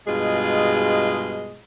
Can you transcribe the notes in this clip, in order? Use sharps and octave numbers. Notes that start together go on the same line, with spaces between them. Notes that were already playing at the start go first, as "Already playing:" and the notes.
G2 B2 G#3 F4 G#4 D#5